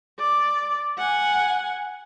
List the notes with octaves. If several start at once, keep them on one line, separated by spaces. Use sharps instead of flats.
D5
F#5 G#5